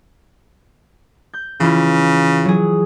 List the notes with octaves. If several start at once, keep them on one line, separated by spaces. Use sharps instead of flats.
G6
C#3 E3 E4 F4
F#3 G#4